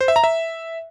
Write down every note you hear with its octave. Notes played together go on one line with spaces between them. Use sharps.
C5
E5
A#5
E5